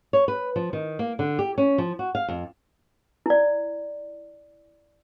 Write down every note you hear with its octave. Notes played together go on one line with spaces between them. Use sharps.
C#5
B4
F3
D#3
A#3
D3
G4
C#4
F3
F#4
F5
F2
E4 D5